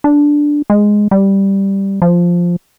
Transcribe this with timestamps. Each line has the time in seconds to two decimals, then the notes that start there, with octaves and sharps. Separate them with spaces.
0.04 D4
0.70 G#3
1.11 G3
2.02 F3